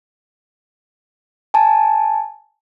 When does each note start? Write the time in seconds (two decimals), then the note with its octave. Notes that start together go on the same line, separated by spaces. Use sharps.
1.54 G#5 A5